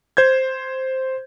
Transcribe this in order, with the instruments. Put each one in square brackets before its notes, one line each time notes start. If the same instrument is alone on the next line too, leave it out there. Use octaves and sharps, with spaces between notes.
[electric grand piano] C5 G6 G#6